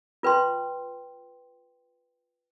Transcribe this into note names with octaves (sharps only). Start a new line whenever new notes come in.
F4 B4 G5 C6